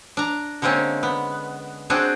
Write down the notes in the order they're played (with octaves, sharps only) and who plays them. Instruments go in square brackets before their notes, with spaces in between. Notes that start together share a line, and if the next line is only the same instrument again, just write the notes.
[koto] D4 A#5
D3 G#3 A#3 C4 C#4
B3
C4 D4 F#4 G#4 C5